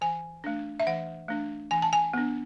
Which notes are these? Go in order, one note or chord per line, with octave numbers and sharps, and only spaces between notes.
E3 G#5
A3 D4
E5
E3 F#5
A3 D4
E3 G#5
A5
G#5
B3 D4